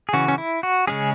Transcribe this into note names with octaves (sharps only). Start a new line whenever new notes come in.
G#4
C#3 E3 C#4 F#4
C#4
E4
F#4
C#3 G#3 C#4 G#4